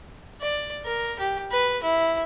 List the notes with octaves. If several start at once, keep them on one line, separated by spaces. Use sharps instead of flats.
D5
A#4
G4
B4
E4